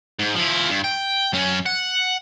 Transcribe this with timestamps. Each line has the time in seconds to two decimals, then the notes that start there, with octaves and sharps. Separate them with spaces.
0.19 G#2
0.35 F3 E4
0.70 G2
0.84 G5
1.33 F#2 C#4
1.66 F#5